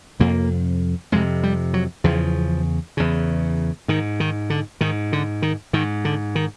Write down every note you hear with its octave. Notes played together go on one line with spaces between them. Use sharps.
F2 C3 A#3
F2 C3 G#3
G3
F#3
E2 C#3 F3
E2 C#3
G#2 D#3
D#3
D3
G#2 D#3
D3
D#3
G#2 D#3
D3
D#3